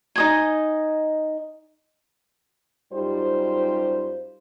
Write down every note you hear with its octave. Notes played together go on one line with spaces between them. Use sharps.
D#4 D#5 G#5
F#2 G3 D#4 F4 G4 C5